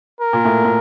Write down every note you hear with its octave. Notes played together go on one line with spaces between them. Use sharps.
A#4
A#2
A2
A2